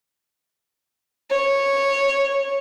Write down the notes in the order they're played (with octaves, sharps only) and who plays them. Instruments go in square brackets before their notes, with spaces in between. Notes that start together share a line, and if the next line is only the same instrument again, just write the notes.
[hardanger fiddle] C#5